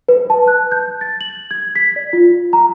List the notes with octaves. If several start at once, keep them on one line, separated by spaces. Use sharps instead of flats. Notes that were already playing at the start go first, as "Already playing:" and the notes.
B4
A5
F#6
G6
A6
F#7
G#6
B6
D5
F4
A#5